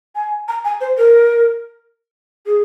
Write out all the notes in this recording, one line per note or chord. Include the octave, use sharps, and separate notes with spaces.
G#5
A#5
G#5
C5
A#4
G#4